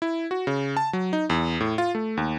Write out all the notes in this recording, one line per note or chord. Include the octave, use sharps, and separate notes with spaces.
E4
F#4
C#3
A5
F#3
D#4
E2
A2
F4
A3
D#2